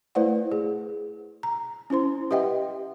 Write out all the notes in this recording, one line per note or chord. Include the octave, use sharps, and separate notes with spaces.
A3 E4 B4 C5 D5 F#5
G#4
A#5
C#4 E4 C5 C6
G4 B4 D#5 E5 F#5 G5